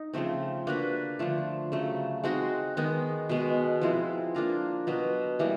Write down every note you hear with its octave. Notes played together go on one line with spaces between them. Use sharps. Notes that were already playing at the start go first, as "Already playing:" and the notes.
Already playing: D#4
C#3 F3 A3 C4
A#3 D4 F#4 B4
D3 F3 A3
C#3 F#3 A3
G#3 C4 D#4 F#4
D#3 G#3 B3 D#4
B2 G#3 B3
F3 G#3 C4 E4
A#3 D4 F4 A#4
B2 F#3 B3
E3 G3 A#3